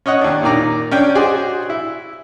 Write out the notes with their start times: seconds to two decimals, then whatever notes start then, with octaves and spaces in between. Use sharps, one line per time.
0.06 C#4 C#5 D#5 F#5
0.21 D#2 D4
0.43 A#2 D#3 D5 A#5
0.91 C#4 D4 G5
1.15 F#4 G#4 C5 D5 D#5
1.70 E4